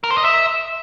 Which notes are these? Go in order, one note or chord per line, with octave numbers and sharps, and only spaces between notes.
A#4
C5
D#5
E5